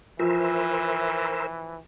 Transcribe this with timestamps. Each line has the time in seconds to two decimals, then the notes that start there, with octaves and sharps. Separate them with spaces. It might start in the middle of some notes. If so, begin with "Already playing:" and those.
0.19 E3 F3 A#4 C5 E5